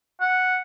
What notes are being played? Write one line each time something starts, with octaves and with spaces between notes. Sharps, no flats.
F#5